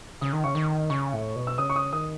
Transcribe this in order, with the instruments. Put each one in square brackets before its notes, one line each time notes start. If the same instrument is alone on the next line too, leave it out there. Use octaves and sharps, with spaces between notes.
[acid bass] C#3 [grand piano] D#6
[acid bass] D#3
[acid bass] C#3 [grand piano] C#6
[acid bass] D#3
[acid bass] C#3 [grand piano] C#6
[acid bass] A2
B2
[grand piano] E6
[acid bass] C#3 [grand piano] D#6
[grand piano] C#6
D#6
[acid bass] D#3 [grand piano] D#6